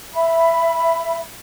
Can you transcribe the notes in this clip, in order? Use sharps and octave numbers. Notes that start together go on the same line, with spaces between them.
E5 B5